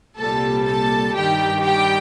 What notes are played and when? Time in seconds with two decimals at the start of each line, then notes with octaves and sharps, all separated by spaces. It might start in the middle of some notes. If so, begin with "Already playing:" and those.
0.17 C2 A#2 G3 A4 A5
0.65 A4 A5
1.14 G2 D#3 G3 G4 G5
1.63 G4 G5